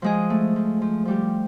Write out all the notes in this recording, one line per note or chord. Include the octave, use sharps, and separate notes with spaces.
F3 G#3 G#4
A3
F3
F3
F3 G3 G4